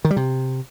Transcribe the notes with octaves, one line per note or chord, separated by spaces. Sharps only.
D#3
G3
C3